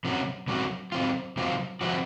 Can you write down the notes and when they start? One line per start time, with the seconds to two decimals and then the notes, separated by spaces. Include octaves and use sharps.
0.05 C3 F#3 C#4 F#4
0.48 C3 F#3 C#4 F#4
0.92 C3 F#3 C4 F4
1.37 C3 F#3 C4 F4
1.81 C3 F3 C4 F#4